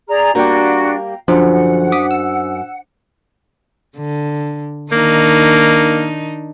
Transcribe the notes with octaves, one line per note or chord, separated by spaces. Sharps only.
G#4 D5 A#5
G3 A#3 D4 F#4 G5 A#5
F#2 D3 F3 D4 C5 F#5
D6 D#6 B6
E6
D3
D#3 A#3 D4 D#4